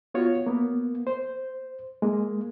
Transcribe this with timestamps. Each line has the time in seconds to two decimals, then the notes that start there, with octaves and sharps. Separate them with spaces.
0.14 B3 F4 F#4 C#5
0.46 A#3 B3
1.07 C5
2.02 G#3 A#3